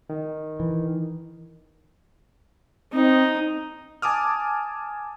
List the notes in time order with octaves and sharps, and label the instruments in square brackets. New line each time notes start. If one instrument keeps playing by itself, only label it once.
[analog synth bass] D#3
[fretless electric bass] E3
[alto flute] C4 [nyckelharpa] D#4
[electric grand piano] G#5 A5 D6 D#6 F6